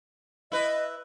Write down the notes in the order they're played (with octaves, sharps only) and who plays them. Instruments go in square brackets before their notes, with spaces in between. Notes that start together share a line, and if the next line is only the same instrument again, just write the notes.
[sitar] E4 B4 [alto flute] D#5